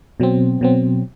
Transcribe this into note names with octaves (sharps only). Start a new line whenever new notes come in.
B2 F#3 C4
B2 F#3 C4